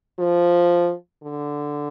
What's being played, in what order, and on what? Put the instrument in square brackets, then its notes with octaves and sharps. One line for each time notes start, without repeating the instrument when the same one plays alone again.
[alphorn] F3
D3